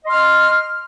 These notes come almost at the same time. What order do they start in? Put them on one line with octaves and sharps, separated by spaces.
D#5 C6 F6